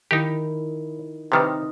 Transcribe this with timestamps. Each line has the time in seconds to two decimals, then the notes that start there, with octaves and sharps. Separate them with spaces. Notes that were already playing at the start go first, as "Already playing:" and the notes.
0.11 D#3 D#4 E4 G4
1.32 C3 D#3 G3 C4 D#4 B4 C5